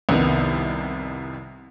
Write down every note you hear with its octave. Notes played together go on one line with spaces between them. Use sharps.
C2 F2 C3 D#3 B3